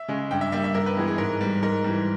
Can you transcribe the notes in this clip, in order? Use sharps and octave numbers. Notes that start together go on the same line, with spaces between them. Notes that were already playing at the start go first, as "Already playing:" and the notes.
Already playing: E5
C#3 G#3
G2 G5
E5
G3 A#3 E5
E5
G2 A#4
B4
E3 G#3 B3 G#4
G#4
G#2 A#4
G3 B3
G#2 A#4
E3 G3